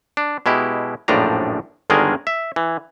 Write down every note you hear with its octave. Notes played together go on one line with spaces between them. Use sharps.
D4
B2 G#3 E4 G4
A#1 F#2 A2 F3 D4 A#5
G1 D3 D#3 G#3 G#4 A#4
E5
E3